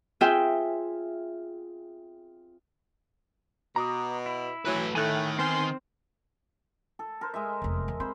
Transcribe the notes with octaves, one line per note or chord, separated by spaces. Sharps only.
C4 F4 G#4 E5 G5
B2 A#5 D6 D#6
E4
E3 F#3 A3 B4
A2 D#3 A3 G#5 F#6
B3 C4 C5 G#5 C6 F6
A4
A#4 C5
G#3 D#5 E5
F1 E2
E2
C4 C5 B5